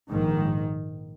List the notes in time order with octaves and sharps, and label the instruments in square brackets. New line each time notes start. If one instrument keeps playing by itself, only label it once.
[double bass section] A#1 G#2 D#3